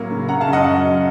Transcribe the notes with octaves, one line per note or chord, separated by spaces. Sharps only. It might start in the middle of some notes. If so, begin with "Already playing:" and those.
Already playing: A2 F#3 A#3 C#4
C#3
C#3 F#5 A#5
F5 A5
F#2
D#5 F#5
F#3
F#2